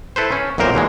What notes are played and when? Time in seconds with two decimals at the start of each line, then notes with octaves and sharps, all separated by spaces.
0.16 E4 A4 B4 C5
0.32 C#4
0.58 B1 F#2 A#2 A#4 C5
0.74 D#2 D3 E3 G#3